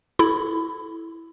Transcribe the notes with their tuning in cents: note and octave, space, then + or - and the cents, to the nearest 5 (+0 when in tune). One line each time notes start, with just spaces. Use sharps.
E4 +0 A4 -20 B5 +20